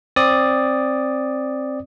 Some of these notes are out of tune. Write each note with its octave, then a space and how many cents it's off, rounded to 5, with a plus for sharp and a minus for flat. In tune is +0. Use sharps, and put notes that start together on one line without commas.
C4 +15 D5 +0 D#6 +0